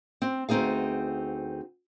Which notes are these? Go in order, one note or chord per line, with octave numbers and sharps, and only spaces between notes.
C4
D2 B3 C4 D#4 G#4 F5